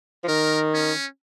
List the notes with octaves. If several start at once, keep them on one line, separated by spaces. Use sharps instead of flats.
F3
D#3 A#4
C#4